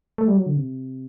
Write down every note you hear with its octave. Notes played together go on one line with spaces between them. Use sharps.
A3
G3
F#3
D3
C3